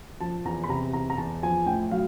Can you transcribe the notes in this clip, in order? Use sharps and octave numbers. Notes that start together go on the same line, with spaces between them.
F3 A5
E2 A#5
B5
C3 A#5
E2 A#5
A#5
E2 A5
F3 G#5
A2 G5
F#3 F5